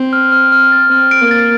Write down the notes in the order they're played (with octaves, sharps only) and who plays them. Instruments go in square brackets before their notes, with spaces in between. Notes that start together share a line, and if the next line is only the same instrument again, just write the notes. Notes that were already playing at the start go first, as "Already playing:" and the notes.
Already playing: [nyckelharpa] C4
[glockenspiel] F6
F6
F6
A6
[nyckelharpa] C4 [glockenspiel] F6
[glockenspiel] D7
[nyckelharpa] A#3
[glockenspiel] A6